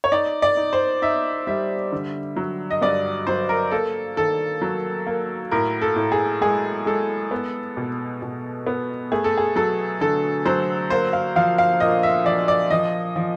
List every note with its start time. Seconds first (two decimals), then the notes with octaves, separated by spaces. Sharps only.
0.04 C#5
0.12 D#4 D5
0.42 D5
0.57 D#4
0.73 C5
1.02 D#4 E5
1.47 G3 E5
1.92 D3
2.36 F#3
2.71 D#5
2.81 G2 D5
3.27 F#3 C5
3.49 A#4
3.71 A#3 A4
4.17 D#3 A4
4.62 F#3
5.06 A#3
5.51 A2 A#4
5.81 A4
5.96 A2
6.12 G#4
6.41 G#3 G#4
6.86 G#3 A4
7.31 B3
7.77 B2
8.22 B2
8.67 B3
9.12 A3 G#4
9.24 A4
9.37 G#4
9.56 F#3 A4
10.01 D3 A4
10.45 F#3 C5
10.90 A#3 C5
11.13 F5
11.36 F3 F5
11.58 F5
11.80 A#2 D#5
12.03 E5
12.25 F3 D5
12.48 D5
12.70 F3 D#5
13.16 F3